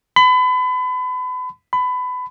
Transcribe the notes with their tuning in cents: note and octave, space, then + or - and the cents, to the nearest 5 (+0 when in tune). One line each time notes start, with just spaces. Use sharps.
B5 +35
B5 +25